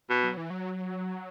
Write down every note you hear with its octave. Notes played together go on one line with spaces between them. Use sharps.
B2
F#3
E3
F#3